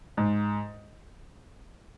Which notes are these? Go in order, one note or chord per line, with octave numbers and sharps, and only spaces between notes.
G#2